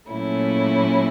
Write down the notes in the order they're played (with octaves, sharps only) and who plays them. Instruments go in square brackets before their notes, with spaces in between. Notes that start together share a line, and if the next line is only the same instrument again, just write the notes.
[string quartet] A#2 F#3 A3 C#4 E4